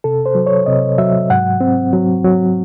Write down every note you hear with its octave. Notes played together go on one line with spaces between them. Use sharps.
C3 A4
C5
F#3
C#5
C3 D#5
F#3 E5
G#2 F#5
C4
F#3
F#3